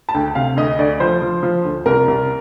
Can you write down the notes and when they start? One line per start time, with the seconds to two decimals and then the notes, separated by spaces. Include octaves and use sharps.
0.09 A5
0.14 D2 G5
0.35 C3 F5
0.57 D2 D#5
0.79 D2 D5
1.00 F3 C5
1.22 F3
1.43 F3
1.65 D2
1.86 C2 A#4
2.08 C2